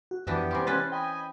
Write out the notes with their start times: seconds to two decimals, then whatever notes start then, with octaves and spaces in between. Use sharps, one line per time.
0.11 F#4
0.27 F2 E3 B3 D4 G4 E5
0.51 C3 G3 G#5 C6 D6
0.67 C#4 B4 C5 C6 A6
0.92 D#5 G5 G#5 B5